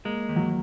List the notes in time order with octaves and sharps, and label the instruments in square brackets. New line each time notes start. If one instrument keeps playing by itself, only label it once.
[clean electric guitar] G#3 [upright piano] A#3
[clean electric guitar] D#2
[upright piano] F#3